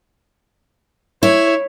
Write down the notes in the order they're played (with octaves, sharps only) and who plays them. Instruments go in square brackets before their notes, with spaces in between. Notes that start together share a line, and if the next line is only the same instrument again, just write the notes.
[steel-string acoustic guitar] E4 [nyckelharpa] C#5